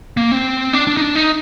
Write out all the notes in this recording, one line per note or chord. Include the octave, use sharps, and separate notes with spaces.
A#3
C4
D4
D4
D#4
D4
D#4